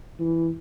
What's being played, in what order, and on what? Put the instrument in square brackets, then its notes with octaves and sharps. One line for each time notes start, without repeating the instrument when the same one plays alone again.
[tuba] E3